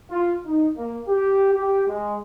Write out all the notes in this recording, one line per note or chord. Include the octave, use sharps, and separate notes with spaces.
F4
D#4
A#3
G4
G4
G#3